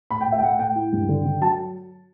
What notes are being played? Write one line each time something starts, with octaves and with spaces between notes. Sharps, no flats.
A2 B5
G5
A2
E5
G5
A3 F#5
A2 G5
E4
G2
D3
D3
F#3 A5